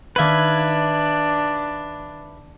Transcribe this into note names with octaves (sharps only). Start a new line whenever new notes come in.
D#3 D4 B4 E5 F5 G#6